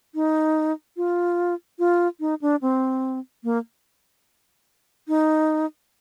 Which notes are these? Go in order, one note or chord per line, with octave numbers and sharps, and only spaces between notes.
D#4
F4
F4
D#4
D4
C4
A#3
D#4